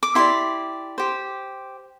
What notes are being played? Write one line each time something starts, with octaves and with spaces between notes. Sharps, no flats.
D6
E4 G4 D5 C6
G4 C5